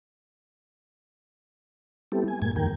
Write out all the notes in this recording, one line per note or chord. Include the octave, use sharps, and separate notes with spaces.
G3 B3 C4 E4 G4 A4
G#5
F#2 A2 G#3 A#3 G#6
F2 D#3 A#4 G5